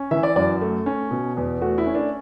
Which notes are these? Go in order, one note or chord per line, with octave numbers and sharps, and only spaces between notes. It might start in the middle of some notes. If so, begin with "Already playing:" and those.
Already playing: C#4
E3 E5
D5
F#2 D5
A3
C#4
B2
E2
A3 F#4
E4
C#4
D4